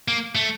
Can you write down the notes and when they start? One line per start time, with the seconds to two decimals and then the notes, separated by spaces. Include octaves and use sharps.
0.08 A#3
0.35 A3